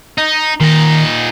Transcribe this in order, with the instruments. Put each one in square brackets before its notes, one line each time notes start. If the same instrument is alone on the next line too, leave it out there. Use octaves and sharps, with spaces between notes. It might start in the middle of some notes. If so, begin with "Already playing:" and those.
[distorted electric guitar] D#4
[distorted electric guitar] A#2 D#4 [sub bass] D#3